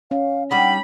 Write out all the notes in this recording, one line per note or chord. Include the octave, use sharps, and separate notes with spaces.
C#4 F5
G3 D4 D#4 F#5 B5